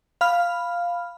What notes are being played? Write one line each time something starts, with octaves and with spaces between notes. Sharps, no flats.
F5 B5 F6